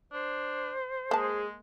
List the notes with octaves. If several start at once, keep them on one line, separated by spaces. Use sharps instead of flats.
D4 C5
G#3 A#3 G#4 A5